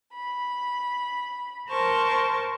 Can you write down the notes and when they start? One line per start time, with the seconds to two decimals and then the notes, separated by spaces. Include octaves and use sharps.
0.15 B5
1.69 A#4 C5 A5 C#6